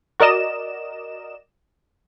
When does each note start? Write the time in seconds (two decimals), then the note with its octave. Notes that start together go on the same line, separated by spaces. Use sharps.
0.20 F#4 A#4 D5 D#5 E7